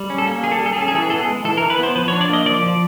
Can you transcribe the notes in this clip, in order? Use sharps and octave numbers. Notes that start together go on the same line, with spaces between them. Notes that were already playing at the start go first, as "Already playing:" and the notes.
Already playing: G3
C#4
A4
A#3
G3 G#4
A4
G3 G#4
A4
G#4
C#4 A4
G#4
E3 A4
G#4
B3 A4
G#4
G#3
E3 A4
A#4
E3
B4
B3 C5
F3 B4
C#5
D4
D5
A#3 D#5
F3 D5
F3